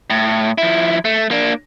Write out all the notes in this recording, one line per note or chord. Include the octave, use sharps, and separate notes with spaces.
A2
F3 E4
A3
A#3 D4